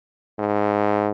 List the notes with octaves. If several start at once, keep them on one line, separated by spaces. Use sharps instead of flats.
G#2